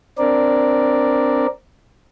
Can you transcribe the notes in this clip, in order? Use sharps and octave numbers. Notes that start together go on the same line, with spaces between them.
C4 D4 A#4 D5